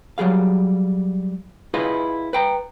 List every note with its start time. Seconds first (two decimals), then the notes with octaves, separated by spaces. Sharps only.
0.18 F#3 G3 G#4 F5
1.74 E4 F4 G#4 B4 D#5 F5
2.33 B4 G5 A#5